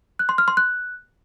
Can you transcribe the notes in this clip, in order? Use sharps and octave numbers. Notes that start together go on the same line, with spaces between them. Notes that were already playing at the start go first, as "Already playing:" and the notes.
F#6
C6
F6
C6
F#6